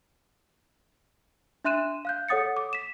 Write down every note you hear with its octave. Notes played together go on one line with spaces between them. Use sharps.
D4 E5 C6 F#6 D#7 E7
F5 F#6 G6
A4 C#5 F#5 D#6 A6 C#7
D6
B6 E7